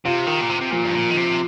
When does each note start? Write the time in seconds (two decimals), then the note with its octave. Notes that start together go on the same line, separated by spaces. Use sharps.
0.05 C3 F4
0.27 D#3
0.41 A#2
0.50 C3
0.61 C3
0.72 A#2 F3
0.85 G2
0.94 A#2
1.11 D#3
1.17 C3